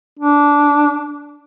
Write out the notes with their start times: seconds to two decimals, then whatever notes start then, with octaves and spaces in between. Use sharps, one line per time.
0.19 D4